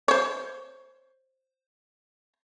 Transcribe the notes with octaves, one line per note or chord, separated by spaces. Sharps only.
C5 C#5